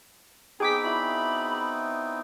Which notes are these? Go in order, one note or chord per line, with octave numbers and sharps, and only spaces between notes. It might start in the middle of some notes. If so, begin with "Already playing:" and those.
B3 C4 D#4 G#4 G5 D6 B6
E4 F#4 D5 B5